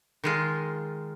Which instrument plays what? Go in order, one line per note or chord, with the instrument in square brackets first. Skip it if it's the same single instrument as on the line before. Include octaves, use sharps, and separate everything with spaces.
[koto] D#3 G#3 F4